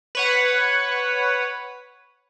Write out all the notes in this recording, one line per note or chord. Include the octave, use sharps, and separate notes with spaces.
B4 C#5 F#5